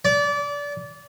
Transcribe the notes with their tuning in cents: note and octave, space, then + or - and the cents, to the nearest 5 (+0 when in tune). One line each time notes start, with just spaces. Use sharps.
D5 -25